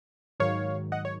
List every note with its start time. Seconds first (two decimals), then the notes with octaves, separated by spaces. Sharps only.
0.40 G#2 D#3 F#3 C#5 F5
0.92 D#5 F#5
1.05 C#5